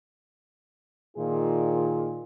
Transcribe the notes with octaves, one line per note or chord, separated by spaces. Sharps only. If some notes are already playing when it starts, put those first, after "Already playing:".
A#2 D#3 F4 G#4